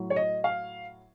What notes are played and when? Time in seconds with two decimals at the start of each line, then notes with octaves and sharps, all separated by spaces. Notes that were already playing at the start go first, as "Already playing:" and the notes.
Already playing: A2 F#3
0.10 C#5
0.16 D#5
0.44 F5